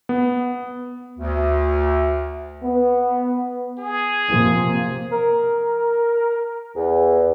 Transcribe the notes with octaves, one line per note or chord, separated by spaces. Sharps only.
B3
D2
B3
G#4
C3 F3 A#3
A#4
E2